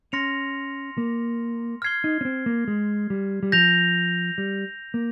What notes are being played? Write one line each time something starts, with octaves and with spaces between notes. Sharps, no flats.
C#4 C6 F6 A#6 C#7 F7
A#3
F6 G#6 C7 G7
D#4
C#4
C4
A#3
G#3
G3
G3
F3 G6 A#6 F7
G3
A#3